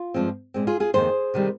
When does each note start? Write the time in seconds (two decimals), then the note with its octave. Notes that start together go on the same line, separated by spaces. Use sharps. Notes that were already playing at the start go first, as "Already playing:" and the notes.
Already playing: F4
0.14 G2 F3 G#3 C4
0.54 A#2 G#3 C4
0.67 F4 G#4
0.80 F4 G#4
0.94 F2 D#3 A#3 G#4 C5
1.34 C3 D#3 G3